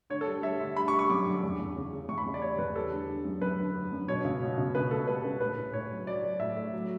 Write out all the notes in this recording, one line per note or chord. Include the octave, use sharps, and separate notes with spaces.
D3 C#5
A4
G3
G3 E5
D3
G3 B5
C#6
G3
C#6
F#2 D6
D3
E2
E2
C#3
C#3
E2 C#6
B5
C#3
D5
G3 C#5
E2 B4
G3 A4
D3
D3
F#2
F#2 B4
D3
D3
F#2
B2 C#5
C#2
B2
C#2
C#2 B4
C#2 A4
G3 B4
C#2
A2 B4
A2
A2 C#5
F#3
F#3 D5
F#3
A2 E5
A3
F#3